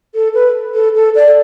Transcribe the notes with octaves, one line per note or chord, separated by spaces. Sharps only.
A4
B4
A4
A4
D5